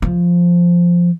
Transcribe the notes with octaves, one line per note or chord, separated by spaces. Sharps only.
F3